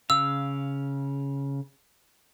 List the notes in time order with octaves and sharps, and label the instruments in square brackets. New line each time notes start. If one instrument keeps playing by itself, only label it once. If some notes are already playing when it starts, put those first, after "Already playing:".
[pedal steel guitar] C#3 F5 [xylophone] E6